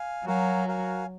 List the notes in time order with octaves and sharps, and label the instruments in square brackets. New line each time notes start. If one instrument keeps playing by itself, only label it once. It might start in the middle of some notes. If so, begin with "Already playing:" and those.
Already playing: [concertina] F5 G#5
[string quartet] F#3 [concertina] F#4 A#4 F5 G#5
[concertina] F#4 A#4 F5 G#5